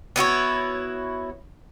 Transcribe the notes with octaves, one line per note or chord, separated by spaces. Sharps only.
B3 E4 F#4 C#5